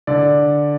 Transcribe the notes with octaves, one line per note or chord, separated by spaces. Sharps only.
D3 D5